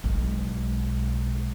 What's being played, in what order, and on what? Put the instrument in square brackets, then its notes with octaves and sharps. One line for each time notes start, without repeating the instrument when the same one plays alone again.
[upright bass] B1 G#3